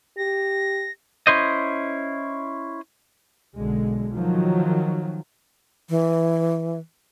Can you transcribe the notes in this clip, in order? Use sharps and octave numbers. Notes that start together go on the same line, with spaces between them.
G4 A#6
C#4 E4 C5 D#5
B1 D3 G#3
D#3 F3 F#3
E3